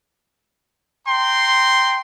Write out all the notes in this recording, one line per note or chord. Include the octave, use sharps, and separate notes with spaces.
G5 A#5 C6